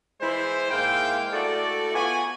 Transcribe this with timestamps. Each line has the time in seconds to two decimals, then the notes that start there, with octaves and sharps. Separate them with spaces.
0.21 E3 G#3 E4 C5
0.71 G#2 G#3 A#3 E4 F5 G5
1.33 A3 E4 F#4 A4 D5
1.94 B3 F4 F#4 G#5